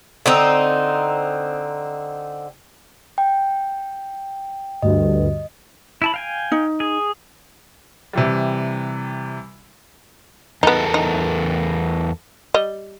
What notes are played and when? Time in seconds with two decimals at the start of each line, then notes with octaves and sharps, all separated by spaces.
0.26 D3 C4 D#4
3.18 G5
4.82 D2 G2 D#5
6.02 E4 A5 B5
6.14 F5 G5 G#5
6.52 D#4
6.80 G#4
8.13 C3 E3 G3
10.63 E2 B3 D#4 A4 A#4
10.94 D#4
12.54 G3 D#5